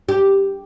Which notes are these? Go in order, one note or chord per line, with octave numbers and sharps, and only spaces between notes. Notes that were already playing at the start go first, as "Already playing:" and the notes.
G4